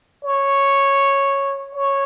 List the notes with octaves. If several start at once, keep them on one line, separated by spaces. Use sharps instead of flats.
C#5
C#5